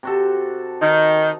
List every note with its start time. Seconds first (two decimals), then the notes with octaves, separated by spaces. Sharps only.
0.03 C3 F#4 A4
0.82 D#3 D#4